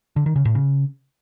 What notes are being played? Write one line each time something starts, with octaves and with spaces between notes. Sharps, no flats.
D3
D#3
C#3
A2
C#3